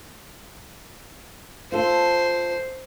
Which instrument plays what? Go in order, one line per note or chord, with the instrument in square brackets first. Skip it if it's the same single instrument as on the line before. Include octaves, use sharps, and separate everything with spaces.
[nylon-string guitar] F4 A4 [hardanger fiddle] C5